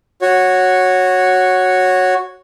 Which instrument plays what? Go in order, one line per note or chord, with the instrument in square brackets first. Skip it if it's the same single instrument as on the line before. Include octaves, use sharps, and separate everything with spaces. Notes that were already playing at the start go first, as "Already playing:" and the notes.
[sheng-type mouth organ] F#4 C#5